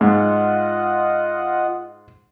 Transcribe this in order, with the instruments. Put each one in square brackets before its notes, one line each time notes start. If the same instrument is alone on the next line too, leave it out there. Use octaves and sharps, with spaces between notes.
[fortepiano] G#2 [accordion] F4 D#5 F#5